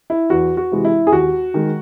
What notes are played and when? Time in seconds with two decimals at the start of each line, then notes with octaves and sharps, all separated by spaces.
0.10 E4
0.30 E2 F#4
0.57 F#4
0.72 C3 E3 G#3
0.85 E4
1.07 G#4
1.12 D#2 F#4
1.54 D#3 G#3